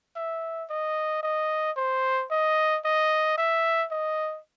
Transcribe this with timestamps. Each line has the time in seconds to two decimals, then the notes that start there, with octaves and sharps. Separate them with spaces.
0.16 E5
0.70 D#5
1.23 D#5
1.77 C5
2.31 D#5
2.85 D#5
3.38 E5
3.91 D#5